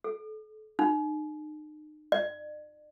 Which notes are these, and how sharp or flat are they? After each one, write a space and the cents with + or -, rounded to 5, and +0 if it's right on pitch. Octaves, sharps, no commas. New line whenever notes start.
A4 -35
D#4 -35
D5 +40